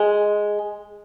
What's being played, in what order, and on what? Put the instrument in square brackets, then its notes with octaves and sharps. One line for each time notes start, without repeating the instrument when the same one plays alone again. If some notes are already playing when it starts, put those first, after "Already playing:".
Already playing: [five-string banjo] G#3